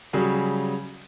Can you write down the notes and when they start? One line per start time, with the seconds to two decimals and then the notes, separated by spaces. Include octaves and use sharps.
0.13 C#3 F#3 G3 G#4